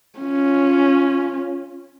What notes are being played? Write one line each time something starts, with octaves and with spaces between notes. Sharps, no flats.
C#4 F4